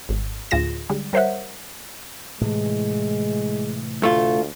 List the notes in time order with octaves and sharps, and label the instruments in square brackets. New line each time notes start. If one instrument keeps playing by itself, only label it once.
[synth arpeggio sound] G#1
D2 A2 F4 G#4 A#6 E7
D3 G3 G#3
G3 A#4 C5 C#5 E5 F#5
[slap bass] A2 C3 E3 [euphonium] G#3
[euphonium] D2 [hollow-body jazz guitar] A3 F4